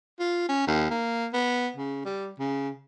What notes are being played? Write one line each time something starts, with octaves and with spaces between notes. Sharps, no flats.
F4
C#4
D#2
A#3
B3
C#3
G3
C#3